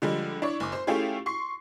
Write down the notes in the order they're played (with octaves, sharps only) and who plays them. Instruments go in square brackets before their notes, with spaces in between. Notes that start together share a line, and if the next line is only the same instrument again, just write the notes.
[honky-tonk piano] D3 F3 G3 G#3
D4 E4 C#5
F#1 D6
C5 C6
A3 C#4 E4 F4 G4 G#4
C6 C#6 C7